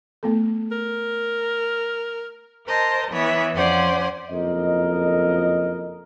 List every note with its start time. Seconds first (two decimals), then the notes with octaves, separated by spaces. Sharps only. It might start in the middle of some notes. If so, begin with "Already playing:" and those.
0.23 A3 B3 A4
0.72 A#4
2.66 A#4 C5 D#5 A5
3.10 E3 B3 C#5 E5
3.53 F2 C#4 C5 D5 F#5 C6
4.30 F#1 F2 A#4 D#5